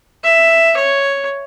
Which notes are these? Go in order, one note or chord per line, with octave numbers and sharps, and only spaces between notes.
E5
C#5